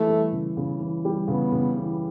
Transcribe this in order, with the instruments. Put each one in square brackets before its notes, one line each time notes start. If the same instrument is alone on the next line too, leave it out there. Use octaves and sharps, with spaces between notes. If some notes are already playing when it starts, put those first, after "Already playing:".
Already playing: [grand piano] E3 [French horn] A3
[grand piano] G3
C#3
C#3
E3
G3
[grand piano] C#3 [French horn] B3
[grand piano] C#3
E3